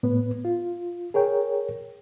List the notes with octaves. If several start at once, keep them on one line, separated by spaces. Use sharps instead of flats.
A2 B3 B4
F4
G#4 A#4 C#5 G5